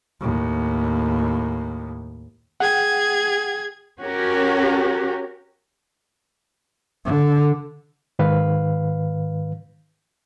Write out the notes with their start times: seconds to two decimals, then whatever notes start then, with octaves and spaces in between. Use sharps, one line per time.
0.21 D#2 A2
2.60 G#4 F#5 G5 G#6
4.00 C#4 F#4 G4 A#4
7.05 D3
8.19 G#2 D#3 B4 F5